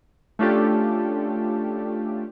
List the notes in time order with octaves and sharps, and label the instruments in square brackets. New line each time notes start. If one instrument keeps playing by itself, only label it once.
[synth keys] A3 C#4 D4 F4 G4 A4